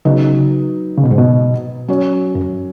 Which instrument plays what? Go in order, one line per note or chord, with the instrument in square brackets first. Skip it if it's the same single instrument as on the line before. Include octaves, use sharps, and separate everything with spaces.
[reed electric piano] C#3 [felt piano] F#3 B3 D#4 B4 D#5
[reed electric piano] C#3
B2
G#2
B2
[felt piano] F#3 C#4 F#4 C#5
[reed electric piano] F#2